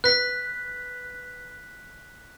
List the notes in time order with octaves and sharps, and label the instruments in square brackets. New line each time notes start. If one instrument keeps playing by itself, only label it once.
[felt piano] B4 [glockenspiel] F#6 B6